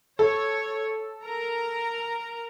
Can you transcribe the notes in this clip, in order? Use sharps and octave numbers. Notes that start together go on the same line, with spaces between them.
A4 C#5
A#4 A#5